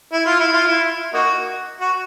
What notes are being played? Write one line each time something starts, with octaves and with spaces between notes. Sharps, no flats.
E4
F4
E4
F4
E4
A#3 D#4 F#4
F#4